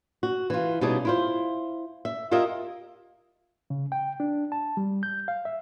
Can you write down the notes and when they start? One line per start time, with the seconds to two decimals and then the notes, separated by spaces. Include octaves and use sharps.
0.23 F#4
0.50 E3 F4
0.81 B2 G3 C#4 D#4 G4 G#4
1.05 E4 F4 C5
2.05 E5
2.31 E4 F4 G4 A#4 D#5 E5
3.70 C#3
3.92 G5
4.20 D4
4.52 A5
4.77 G3
5.03 G6
5.28 F5
5.45 E5